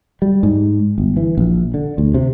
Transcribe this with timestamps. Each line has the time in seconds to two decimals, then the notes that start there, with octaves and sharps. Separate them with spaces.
0.22 G3
0.43 G#2
0.98 G1
1.17 E3
1.38 A#1
1.74 D3
1.98 D2
2.14 C3